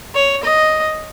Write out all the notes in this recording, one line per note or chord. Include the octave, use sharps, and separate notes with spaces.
C#5
D#5